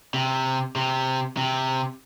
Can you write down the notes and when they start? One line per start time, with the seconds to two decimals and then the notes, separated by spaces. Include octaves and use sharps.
0.14 C3
0.76 C3
1.37 C3